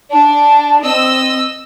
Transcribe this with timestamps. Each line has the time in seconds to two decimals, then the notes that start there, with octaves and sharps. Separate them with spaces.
0.12 D4 A5
0.84 C4 D#5 E6